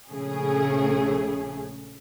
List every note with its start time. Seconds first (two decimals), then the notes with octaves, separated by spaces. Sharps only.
0.11 A#1 C#3 A3 G#4